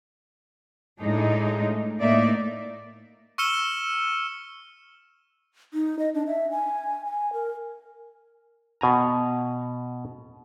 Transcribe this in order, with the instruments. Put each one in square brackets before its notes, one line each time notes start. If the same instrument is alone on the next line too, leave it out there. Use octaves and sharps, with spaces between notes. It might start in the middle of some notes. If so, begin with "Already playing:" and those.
[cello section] A2 G#3 D4 D#4
A2 A#3 D#4 D5 E5
[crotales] C#6 E6 F6 C#7 E7 G7
[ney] D#4
D#5
D4
E5
G#5
G#5
A#4
[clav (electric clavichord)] B2 G#5 A#5